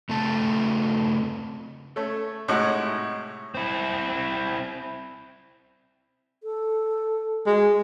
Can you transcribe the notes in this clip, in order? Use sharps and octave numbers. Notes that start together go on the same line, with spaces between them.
C#3 A3 C4 A4 A5
A3 C#4 A4
A2 C3 G#3 D#4 F#4 F#5
C4 E4
A4
G#3 F#4